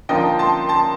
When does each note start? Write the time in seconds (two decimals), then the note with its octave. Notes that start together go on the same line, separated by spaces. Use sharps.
0.09 D3 F3 A#3 D#4 D#5 G5
0.39 A5 C6
0.69 A5 C6